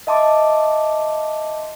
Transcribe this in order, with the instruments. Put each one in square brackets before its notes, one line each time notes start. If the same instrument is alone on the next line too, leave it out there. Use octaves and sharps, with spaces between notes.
[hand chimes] D#5 E5 A5 C6 D6